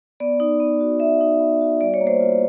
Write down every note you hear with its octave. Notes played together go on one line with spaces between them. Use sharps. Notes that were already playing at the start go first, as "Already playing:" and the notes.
B3 D5
D#4
B3
F#4
B3 E5
D#4
B3
F#4
G3 D5
C#5
A#3
C5
F4